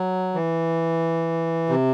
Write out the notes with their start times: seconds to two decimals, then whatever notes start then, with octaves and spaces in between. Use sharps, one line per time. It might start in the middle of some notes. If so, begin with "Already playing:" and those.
Already playing: F#3
0.35 E3
1.69 C3